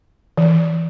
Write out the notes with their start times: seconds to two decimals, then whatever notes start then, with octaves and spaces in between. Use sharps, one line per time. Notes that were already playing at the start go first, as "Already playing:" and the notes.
0.38 E3